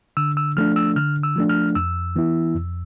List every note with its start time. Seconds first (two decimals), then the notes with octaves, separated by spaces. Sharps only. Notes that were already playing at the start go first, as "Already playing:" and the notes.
0.17 D3 E6
0.37 E6
0.57 F3 A3 D4 F6
0.76 E6
0.96 D3 F6
1.23 E6
1.36 F3 A3 D4
1.49 F6
1.75 F2 E6
2.16 E3 B3 E4
2.55 F2